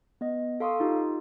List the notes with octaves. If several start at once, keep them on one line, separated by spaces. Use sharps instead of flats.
B3 D#5
A4 F5 C6 C#6 D#6
D#4 F4 G4